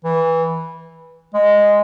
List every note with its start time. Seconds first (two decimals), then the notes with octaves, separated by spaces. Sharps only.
0.04 E3
1.34 G#3